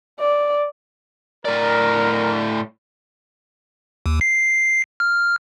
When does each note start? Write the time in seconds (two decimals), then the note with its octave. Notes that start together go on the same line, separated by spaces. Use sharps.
0.20 D5
1.45 A2 A#4 D5
4.06 D#2
4.21 C7
5.00 F6